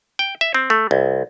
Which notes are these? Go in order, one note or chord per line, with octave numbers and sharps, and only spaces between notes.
G5
E5
C4
A3
C2